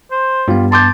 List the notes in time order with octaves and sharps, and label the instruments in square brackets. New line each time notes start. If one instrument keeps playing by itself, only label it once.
[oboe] C5
[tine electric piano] G2 B3 [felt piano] G3 F4
[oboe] A5 [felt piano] C6 D6 G6